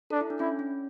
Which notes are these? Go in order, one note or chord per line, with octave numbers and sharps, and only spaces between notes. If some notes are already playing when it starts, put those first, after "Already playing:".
D4 A4
E4
D4
C#4 E4
C#4